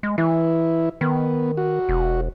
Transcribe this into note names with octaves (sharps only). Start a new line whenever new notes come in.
G#3
E3 E4
D#3 B3
F#4
E1